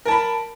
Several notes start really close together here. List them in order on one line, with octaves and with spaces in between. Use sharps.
A#4 A5 B5